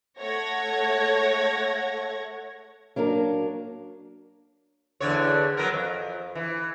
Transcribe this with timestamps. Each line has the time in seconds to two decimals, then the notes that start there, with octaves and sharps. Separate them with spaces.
0.20 A3 C#5 F#5 G#6 A#6
2.96 F#3 A#3 D4 A#4
5.00 E2 D3 C#5
5.57 F#3 B3 A#4
5.74 F2
6.35 E3